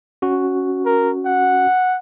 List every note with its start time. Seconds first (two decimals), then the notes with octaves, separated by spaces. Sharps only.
0.22 C#4 F#4
0.85 A#4
1.25 F#5